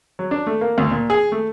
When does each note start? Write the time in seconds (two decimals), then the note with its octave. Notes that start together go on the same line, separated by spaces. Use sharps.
0.19 F#3
0.31 D4
0.47 A3
0.61 A#3
0.78 D2
0.91 A#2
1.10 G#4
1.32 A3